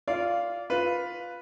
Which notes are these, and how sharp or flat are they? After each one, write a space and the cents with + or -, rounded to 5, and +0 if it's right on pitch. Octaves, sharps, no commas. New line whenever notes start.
F4 +0 D5 -20 F5 -10
F4 +5 B4 +0